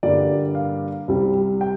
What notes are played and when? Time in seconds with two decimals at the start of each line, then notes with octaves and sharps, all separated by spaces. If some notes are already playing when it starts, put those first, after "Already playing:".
0.03 G2 D3 G3 A#3 D5
0.55 F5
1.08 C2 C3 G3 C4
1.61 G5